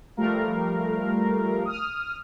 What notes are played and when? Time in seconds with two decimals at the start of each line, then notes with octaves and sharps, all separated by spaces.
0.17 F3 G3 A3 A#4 F5
1.65 D#6 F6